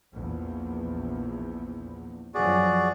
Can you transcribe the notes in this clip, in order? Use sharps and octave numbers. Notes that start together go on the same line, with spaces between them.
A#1 E2
F#2 F3 F#3 F#4 G#4 D5